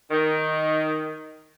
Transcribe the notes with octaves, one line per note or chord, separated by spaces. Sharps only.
D#3